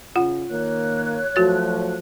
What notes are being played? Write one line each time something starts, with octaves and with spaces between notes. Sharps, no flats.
C#3 F4 F#5
D#3 A#3 C#5 F#6
F3 F#3 A3 F#4 A6